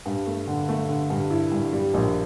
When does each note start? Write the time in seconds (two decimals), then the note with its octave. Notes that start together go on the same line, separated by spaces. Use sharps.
0.06 G2
0.27 A3
0.47 D3
0.69 A3
0.89 D3
1.10 G2
1.31 E4
1.52 G2
1.73 G3
1.94 A#1